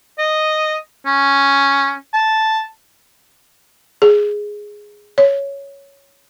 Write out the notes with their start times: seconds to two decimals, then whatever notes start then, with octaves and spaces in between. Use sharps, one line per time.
0.18 D#5
1.06 C#4
2.14 A5
4.02 G#4
5.18 C#5